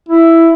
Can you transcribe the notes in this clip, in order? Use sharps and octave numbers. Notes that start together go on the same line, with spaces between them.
E4